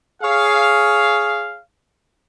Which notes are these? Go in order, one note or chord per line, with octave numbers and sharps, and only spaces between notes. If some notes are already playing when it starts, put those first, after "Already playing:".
G#4 C#5 F5